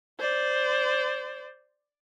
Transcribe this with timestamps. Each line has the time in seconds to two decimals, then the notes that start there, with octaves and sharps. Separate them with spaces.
0.20 C5 D5